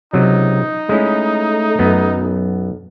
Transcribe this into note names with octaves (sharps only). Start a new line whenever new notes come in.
C#2 C3 F#3 D#4
G#3 A3 C#4 E4
F#2 B3
B1